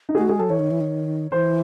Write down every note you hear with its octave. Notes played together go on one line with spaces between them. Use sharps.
D#4
G#4
A3 F#4
G#3 G#4
F#3 A4
E3 C#5
D#3
E3
D#3
E3 C5